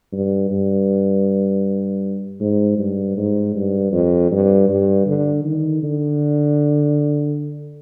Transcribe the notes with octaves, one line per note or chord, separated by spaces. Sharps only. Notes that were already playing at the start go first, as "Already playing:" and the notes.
G2
G2
G#2
G2
G#2
G2
F2
G2
G2
D3
D#3
D3